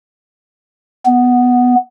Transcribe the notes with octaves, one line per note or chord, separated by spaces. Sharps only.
B3